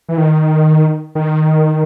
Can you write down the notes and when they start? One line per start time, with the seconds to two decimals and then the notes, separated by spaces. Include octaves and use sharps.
0.09 E3
0.18 D#3
1.15 D#3